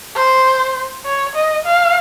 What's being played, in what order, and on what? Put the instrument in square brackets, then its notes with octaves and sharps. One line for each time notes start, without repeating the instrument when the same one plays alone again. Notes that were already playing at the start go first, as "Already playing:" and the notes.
[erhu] C5
C#5
D#5
F5